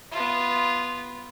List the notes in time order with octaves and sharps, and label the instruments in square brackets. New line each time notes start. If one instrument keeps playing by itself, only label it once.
[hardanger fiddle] B3 F4